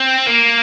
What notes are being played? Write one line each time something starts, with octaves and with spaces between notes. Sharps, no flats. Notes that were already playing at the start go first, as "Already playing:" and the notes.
Already playing: C4
A#3